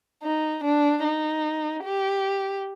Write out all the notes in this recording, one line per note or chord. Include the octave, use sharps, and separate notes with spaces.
D#4
D4
D#4
G4